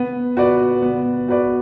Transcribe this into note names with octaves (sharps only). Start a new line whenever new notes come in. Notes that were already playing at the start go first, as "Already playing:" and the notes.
Already playing: B3
F#4 B4 D5
B3
F#4 B4 D5